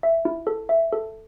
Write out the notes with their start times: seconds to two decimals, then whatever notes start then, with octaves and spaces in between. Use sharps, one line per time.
0.03 E5
0.25 E4
0.47 A4
0.69 E5
0.93 A4